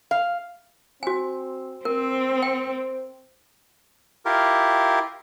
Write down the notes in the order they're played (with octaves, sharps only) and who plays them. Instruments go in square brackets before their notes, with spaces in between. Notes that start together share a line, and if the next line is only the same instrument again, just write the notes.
[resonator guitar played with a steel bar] F5
[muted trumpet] C4 [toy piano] F#4 G#5
[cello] C4 [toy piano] A#4 [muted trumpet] C5
[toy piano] G5
[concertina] E4 F4 G4 A#4